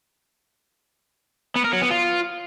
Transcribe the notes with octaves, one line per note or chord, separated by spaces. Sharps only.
B3
A#4
F#3
B3
F4